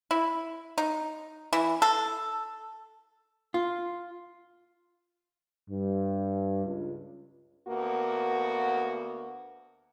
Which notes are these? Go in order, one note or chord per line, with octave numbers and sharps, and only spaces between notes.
E4
D#4
E3
A4
F4
G2
C#2
D2 A#3 B3 F#4